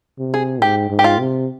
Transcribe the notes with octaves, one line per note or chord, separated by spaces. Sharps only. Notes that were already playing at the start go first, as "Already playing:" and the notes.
C3
G#4
G#2 G4
G#2
G4
F4
C3